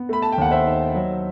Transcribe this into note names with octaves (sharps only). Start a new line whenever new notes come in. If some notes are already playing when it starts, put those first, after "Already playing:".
Already playing: B3
A3 B5
A5
G5
D#2 F#5
C5 E5
D#4
F#3